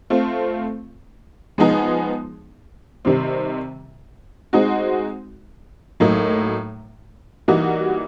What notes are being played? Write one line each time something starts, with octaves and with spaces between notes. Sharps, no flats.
A3 C4 F4
F3 G#3 B3 D#4 G#4
C3 D#3 G3 C4
G#3 C4 D#4 F#4
A2 F#3 A#3 D#4
E3 G3 A#3 D#4 F#4